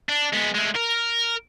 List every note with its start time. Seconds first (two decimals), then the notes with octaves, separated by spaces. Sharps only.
0.09 D4
0.33 G#3 B3
0.55 G#3 A3
0.76 A#4